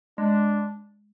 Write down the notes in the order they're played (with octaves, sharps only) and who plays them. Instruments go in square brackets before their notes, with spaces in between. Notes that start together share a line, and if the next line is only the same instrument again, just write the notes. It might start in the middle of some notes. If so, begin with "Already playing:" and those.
[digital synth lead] G#3 [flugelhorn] D4